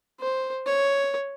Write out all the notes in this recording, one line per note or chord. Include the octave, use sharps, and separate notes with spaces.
C5
C#5